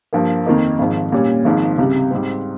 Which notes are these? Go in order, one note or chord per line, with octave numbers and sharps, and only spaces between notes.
G2 F3 A#3
F2 D#3 A#3 D#4
G#1 G#2 F3
A#2 G3 C#4
G#1 G#2 F3
C#2 C3 G3
G#2 G3 C4